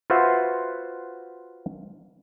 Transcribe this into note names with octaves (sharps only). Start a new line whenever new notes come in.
F4 F#4 B4 C5 E5 F#5